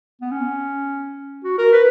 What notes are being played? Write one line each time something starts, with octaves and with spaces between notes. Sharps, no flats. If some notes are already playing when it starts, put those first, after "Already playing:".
B3
C#4
F#4
A#4
B4